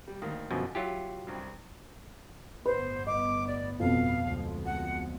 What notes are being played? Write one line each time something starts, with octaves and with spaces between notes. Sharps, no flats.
G3
D2 D#3 A#3
F#2 B2 D3 F3
F#3 E4 F4 G4
C2 G2
G1 A2 B3 B4 C5
D#5 D6
D5
F2 B2 F5
D2 F3 G#3
F#5